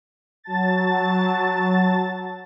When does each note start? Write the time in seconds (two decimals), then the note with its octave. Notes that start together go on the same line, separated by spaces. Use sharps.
0.44 F#3 A5 A6